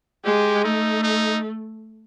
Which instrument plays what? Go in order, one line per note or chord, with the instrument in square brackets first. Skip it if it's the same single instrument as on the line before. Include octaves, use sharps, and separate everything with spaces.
[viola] G#3 [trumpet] G4
[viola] A3 [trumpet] D#4
[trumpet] D#4